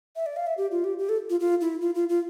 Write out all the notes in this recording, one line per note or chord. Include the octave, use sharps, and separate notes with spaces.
E5
D5
F5
E5
G4
F4
G4
G4
A4
F4
F4
E4
F4
F4
F4